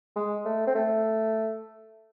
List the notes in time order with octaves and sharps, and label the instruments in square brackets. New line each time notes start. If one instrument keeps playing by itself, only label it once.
[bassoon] G#3
A3
C4
A3